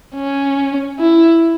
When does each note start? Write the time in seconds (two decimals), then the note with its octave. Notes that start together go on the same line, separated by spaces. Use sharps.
0.15 C#4
0.99 E4